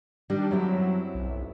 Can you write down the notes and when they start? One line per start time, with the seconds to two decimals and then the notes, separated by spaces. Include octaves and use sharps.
0.30 D#3 G3 D4
0.51 F#2 F#3 C4 E4
1.15 B1